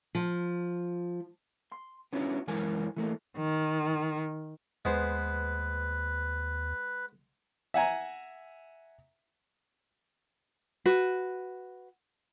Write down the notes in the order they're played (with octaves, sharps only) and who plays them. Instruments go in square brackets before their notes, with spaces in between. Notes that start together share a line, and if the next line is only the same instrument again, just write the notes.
[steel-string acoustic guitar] F3
[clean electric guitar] C6
B3 C#4 D4 E4 F#4
F#2 E3 G#3 E4 A#4 G#5
E3 A3 A#3
[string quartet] D#3
[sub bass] D#2 [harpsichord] G#3 B3 C5 [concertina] B4
[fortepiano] E5 F#5 G#5 A#5
[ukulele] F#4 B4